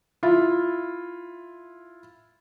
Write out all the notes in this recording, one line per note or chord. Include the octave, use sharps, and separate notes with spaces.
E4 F4